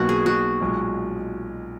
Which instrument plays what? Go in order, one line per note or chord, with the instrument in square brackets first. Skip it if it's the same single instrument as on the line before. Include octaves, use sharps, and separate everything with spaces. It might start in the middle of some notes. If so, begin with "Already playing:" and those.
Already playing: [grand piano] B1 B2 A#3 [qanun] F#4
[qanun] G#4
F#4
[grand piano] B1 A#2 G#3